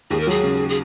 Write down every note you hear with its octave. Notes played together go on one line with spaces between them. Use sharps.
D#2 G#4
A#4
F#3 G#4
C#3
G#4